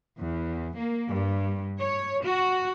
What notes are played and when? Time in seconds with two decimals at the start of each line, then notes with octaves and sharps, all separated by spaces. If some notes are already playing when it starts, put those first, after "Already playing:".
0.19 E2
0.77 A#3
1.09 G2
1.80 C#5
2.25 F#4